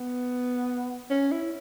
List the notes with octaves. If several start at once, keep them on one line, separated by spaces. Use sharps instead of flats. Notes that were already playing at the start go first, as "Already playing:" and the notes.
Already playing: B3
C#4
E4